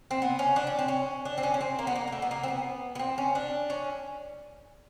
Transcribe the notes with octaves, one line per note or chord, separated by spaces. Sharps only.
C4
B3
C#4
D4
C#4
C4
C#4
D4
C4
C#4
C#4
C4
A#3
B3
A#3
A#3
A3
B3
A#3
C4
B3
B3
C4
C#4
D4
C#4